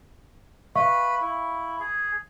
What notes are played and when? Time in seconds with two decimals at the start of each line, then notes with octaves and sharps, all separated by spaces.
0.76 B4 E5 F5 B5 C#6
1.21 E4
1.80 G#4